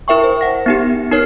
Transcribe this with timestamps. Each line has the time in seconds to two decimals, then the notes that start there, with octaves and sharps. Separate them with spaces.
0.08 E4 A#4 E5 G5 C#6
0.24 C5
0.41 F#5 A#6
0.66 B3 D#4 G4
1.11 D#4 A#4 C#5 F6 C7